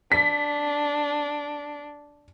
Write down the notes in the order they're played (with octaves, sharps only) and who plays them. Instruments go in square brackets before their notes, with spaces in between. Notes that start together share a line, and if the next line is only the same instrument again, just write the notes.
[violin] D4 [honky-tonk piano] B6